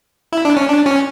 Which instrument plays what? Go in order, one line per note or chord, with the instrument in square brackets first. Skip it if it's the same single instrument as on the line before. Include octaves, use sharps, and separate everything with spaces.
[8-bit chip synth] E4
D4
C#4
D4
C#4